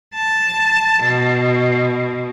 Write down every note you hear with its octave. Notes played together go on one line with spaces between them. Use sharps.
A5
B2